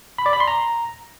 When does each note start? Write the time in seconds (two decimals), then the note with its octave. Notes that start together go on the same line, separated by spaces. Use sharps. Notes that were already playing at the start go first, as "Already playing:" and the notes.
0.18 B5
0.26 D5
0.33 B5
0.40 C6
0.48 A#5